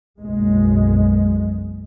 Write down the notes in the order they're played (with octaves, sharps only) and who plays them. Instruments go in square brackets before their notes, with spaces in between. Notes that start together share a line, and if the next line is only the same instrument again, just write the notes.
[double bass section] F#1 B1 G#3